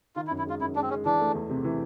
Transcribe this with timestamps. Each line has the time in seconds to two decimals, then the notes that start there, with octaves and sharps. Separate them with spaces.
0.16 D#3 F4
0.27 E4
0.31 F#2
0.38 E4
0.46 G#3 F4
0.61 F#2 E4
0.75 G#3 D4
0.83 C4
0.90 G#3 C#4
1.05 E3 D4
1.20 A3
1.35 E2
1.50 C3
1.64 E3